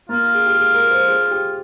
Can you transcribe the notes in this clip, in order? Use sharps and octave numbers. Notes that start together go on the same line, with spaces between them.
A#3 F4
G#4
G4
G#4
A#4
C5
G#4
G4